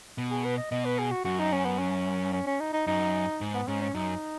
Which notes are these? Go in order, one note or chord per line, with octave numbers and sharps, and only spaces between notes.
B2
G#4
B4
D#5
B2 D#5
B4
G#4
F#4
F#2 F#4
D#4
C#4
B3
C#4
C#4
C#4
D#4
D#4
F#2 D#4
G#2
B3
G#2 C#4
C#4
F#2 D#4